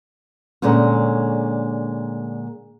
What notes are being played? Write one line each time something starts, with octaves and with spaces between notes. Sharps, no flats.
A#2 D3 G#3 A3 C#4